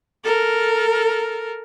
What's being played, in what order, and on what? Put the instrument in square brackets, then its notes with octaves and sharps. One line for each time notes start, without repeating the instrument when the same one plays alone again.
[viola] A4 A#4